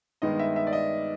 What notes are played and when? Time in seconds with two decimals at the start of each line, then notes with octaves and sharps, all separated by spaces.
0.22 G2 D#3 G#3 B3 D#5
0.39 E5
0.56 E5
0.67 D5
0.73 D#5